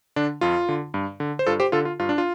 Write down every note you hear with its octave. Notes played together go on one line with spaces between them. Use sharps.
D3 D4
F2 F4
D3
G2
D3
C5
G2 F4 A4
G4 C5
D3 F4 A4
F4
G2 F4
D4
F4